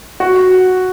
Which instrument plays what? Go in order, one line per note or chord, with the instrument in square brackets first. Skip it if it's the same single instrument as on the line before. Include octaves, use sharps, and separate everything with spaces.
[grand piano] F#4